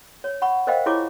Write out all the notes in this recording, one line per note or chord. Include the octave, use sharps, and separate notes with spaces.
C#5
F#5 B5 C#6
A#4 C5 D#5 F5 G5
E4 F4 G#4 C#5 C#6 D6